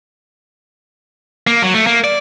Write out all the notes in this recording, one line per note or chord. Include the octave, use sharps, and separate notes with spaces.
A#3
F#3
A3
A#3
D5